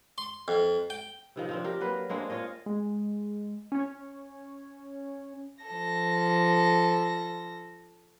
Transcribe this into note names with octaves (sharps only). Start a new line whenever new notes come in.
C6
F2
G5
C3 D#3 F3
F3 C4 D4
G4 A#4
F#3 A#3 B4
G#3 A#3 C4 D4
F4 C#5 D#5
G#3
C#4 C#5
F3 A4 A#6